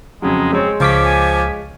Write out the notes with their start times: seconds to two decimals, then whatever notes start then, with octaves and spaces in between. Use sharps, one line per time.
0.22 F2 C#3 F#3 G#3
0.53 G#3 C4 C#5
0.80 C#2 F3 C#4 D6 B6
1.05 G#5